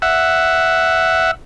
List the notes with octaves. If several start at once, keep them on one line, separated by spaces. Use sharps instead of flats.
E5 F#5